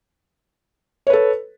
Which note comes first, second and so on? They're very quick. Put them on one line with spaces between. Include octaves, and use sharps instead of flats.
C#5 B4 A4